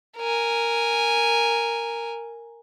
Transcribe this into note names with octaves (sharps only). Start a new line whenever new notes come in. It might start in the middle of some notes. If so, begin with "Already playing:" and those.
A#4 G#5